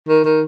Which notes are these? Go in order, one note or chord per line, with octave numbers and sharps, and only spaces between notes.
D#3
D#3